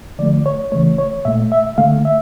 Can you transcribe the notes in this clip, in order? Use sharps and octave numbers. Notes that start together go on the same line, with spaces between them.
D3 F3 A3 D5
C#5
C#3 E3 A3 C#5
C#5
A#2 A3 E5
E5
D3 A3 F5
E5